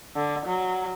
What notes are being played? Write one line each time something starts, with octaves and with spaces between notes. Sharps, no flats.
D3
F#3